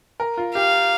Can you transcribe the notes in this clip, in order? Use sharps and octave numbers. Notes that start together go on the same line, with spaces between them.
A#4
F4
G4 F5